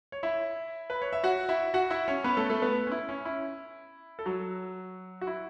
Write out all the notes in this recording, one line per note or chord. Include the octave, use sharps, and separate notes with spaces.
C#5
E4 E5
B4
C#5
E5
F#4 F#5
E4 E5
F#4 F#5
E4 E5
C#4 C#5
B3 B4
A3 A4
A3 A4
B3 B4
C#4
E4
C#4
E4
A4
F#3 F#4
F#4
E4